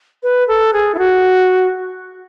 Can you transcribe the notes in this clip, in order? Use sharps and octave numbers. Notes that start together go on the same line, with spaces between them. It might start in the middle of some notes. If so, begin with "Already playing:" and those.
B4
A4
G#4
E4
F#4